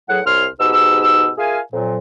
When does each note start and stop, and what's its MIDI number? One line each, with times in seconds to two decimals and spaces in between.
0.09 0.20 40
0.09 0.20 45
0.09 0.20 54
0.09 0.20 68
0.09 0.20 78
0.26 0.46 36
0.26 0.46 73
0.26 0.46 84
0.26 0.46 89
0.60 1.30 44
0.60 1.30 47
0.60 1.30 63
0.60 1.30 67
0.60 1.30 68
0.60 1.30 88
1.38 1.59 65
1.38 1.59 68
1.38 1.59 70
1.38 1.59 76
1.38 1.59 77
1.38 1.59 80
1.72 1.97 41
1.72 1.97 46
1.72 1.97 54